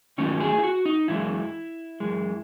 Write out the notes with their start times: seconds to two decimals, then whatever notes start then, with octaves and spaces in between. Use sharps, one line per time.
0.18 E2 D#3 F#3 A3 C#4
0.40 G#4
0.58 E4
0.63 F#4
0.85 D#4
1.08 F#2 E3 G#3 E4
2.00 F#2 E3 G#3